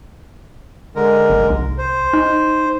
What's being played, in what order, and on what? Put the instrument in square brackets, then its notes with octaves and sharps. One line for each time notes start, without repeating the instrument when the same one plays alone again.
[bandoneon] D3 G#3 A#4
[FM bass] G1
C2
[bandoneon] C5
[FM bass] D#4